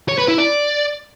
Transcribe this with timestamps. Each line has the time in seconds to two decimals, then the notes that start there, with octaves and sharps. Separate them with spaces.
0.09 C#5
0.18 B4
0.28 E4
0.38 D5